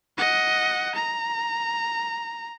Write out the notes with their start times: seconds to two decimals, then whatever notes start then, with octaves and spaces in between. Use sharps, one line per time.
0.18 D#5 F#5
0.95 A#5